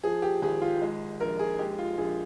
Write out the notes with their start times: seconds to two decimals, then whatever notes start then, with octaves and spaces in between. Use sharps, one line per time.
0.03 F3 G#4
0.22 G4
0.42 G#1 G#4
0.62 F4
0.81 G#3
1.20 A#1 A#4
1.39 G#4
1.59 G#3 G4
1.79 F4
1.98 A#1 G#4